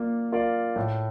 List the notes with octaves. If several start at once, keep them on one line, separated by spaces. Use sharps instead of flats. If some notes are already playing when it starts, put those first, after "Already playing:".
Already playing: A#3 F4 D5
F4 A#4 D5 F5
A2